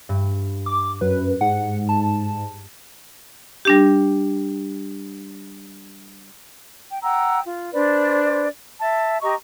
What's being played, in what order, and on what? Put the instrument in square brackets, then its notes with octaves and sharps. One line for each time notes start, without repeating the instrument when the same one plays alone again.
[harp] G2
[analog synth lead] D6
[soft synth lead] F#2 [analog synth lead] B4
[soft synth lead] G#2 [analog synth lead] F#5
[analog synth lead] A5
[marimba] G3 D4 G4
[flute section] G5
F#5 G5 A#5 E6
F4
D4 B4 C5 D5
E5 A5
G4 D#5 A#5 C#6